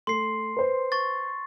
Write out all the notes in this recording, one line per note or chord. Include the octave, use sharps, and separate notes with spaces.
A3 C6 C7
B4 C5
C#6 A6